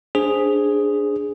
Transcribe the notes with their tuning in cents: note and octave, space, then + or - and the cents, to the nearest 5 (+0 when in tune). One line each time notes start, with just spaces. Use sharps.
D4 +0 G#4 +0 C5 +0